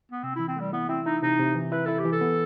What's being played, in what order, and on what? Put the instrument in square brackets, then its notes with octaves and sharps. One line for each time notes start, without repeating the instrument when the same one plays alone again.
[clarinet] B3
[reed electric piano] C3 [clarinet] C4
[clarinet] E4
[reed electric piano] E3
[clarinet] C4
[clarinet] G3 [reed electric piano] A3
[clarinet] B3 [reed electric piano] E4
[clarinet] C4 [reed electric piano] E4
[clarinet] D#4 [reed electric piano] E4
[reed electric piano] C3 [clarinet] D#4
[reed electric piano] C3
E3
[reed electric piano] E4 [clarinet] B4
[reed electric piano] E4 [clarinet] A4
[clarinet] G4
[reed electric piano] E3
[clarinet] A4
[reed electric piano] B3